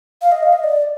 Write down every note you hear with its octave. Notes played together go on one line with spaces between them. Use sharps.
F5
D#5
F5
D#5
D5